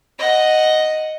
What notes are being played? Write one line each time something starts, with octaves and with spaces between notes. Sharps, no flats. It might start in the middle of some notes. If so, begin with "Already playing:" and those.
D#5 F#5